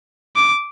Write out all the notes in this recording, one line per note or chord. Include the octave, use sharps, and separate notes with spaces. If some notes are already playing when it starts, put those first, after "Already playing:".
D6